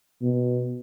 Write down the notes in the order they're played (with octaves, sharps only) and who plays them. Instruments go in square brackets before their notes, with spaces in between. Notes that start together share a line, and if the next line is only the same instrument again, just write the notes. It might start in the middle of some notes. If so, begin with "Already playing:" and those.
[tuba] B2